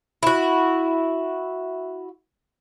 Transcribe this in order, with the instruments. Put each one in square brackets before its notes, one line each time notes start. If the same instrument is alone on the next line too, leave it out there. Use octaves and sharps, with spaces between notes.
[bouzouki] E4 F#4